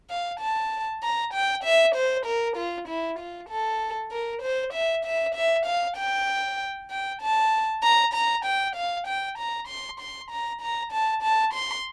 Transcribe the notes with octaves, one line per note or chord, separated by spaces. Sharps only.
F5
A5
A#5
G5
E5
C5
A#4
F4
E4
F4
A4
A#4
C5
E5
E5
E5
F5
G5
G5
A5
A#5
A#5
G5
F5
G5
A#5
C6
C6
A#5
A#5
A5
A5
C6